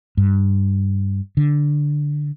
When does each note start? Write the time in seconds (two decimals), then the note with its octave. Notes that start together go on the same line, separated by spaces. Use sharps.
0.17 G2
1.37 D3